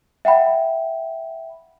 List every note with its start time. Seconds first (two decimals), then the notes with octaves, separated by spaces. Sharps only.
0.25 E5 F#5 G5 B5